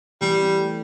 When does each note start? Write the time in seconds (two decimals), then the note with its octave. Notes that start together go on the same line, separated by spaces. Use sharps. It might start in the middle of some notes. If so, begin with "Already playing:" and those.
0.21 E3 G3
0.39 C4
0.57 A3